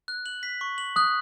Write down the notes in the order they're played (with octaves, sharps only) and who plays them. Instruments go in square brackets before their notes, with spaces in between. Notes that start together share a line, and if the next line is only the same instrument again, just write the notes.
[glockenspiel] F#6
F#7
B6
C#6
F#7
[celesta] D#6 [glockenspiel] F#6